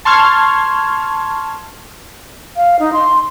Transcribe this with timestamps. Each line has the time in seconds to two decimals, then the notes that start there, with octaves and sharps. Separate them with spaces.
0.05 A5 C6 C#6 F6 G#6
2.56 F5
2.79 D#4
2.93 C6